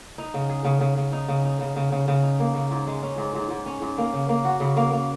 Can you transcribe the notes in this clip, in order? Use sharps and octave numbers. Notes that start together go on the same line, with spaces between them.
D#4
C#3
G#4
C#3
C#3
C#3
D#4
C#3
D#4
C#3
C#3
C#3
C#3
D#4
A#3
C#3
G#2
G#3
C#4
G#2
G#2
G#2
C#4
G#2
A#3
C#3
A#3
F#4
C#3
A#3
A#3